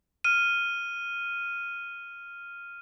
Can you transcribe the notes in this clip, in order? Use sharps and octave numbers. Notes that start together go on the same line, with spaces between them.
F6 D#7